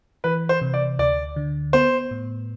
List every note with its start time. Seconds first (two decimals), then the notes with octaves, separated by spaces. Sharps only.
0.24 E3 B4
0.49 C5
0.62 C3
0.74 D5
0.99 D2 D5
1.36 D3
1.73 B3 C5
2.11 A2